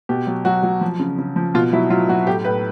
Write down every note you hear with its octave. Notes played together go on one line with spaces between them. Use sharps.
B2 G4
F#3
F#3 F#4
F#3
F3
C#3
C#3
F3
B2 F4
F#3 E4
F#3 F4
F#3 F#4
A2 G4
A2 B4